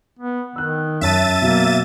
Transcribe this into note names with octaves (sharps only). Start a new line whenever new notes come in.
B3
D#3 E6 F#6
F#2 C#5 E5 A5 A6 D#7
B2 F#3 A#3